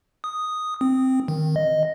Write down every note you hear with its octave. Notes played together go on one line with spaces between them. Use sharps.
D#6
C4
D#3
D#5